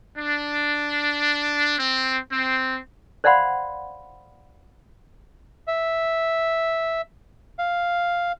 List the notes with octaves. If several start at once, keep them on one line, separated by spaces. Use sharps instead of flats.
D4
C4
C4
C5 D5 F5 F#5 B5 C6
E5
F5